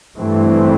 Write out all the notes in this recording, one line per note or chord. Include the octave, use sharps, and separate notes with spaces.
G2 E3 A3 C4